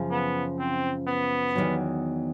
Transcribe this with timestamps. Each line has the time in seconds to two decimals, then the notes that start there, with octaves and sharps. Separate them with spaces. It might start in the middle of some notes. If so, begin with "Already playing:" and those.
Already playing: F#2 C#3 F3
0.11 B3
0.59 C4
1.07 B3
1.55 E2 C3 D#3 F#3